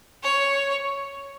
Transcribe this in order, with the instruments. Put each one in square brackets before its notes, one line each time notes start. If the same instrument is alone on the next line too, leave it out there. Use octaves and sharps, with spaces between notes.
[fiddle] C#5